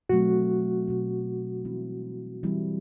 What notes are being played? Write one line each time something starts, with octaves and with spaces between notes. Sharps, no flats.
B2 F#3 A3 C4 F#4
B2 F#3 A3 C4
E3 G3 C4 E4
E3 G3 C4 E4